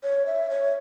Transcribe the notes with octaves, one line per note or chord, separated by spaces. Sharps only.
C#5
E5
C#5